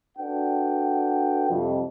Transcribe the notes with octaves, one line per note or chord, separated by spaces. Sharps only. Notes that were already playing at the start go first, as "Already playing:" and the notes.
D4 F#4 A4 B4 F#5 G5
C2 F2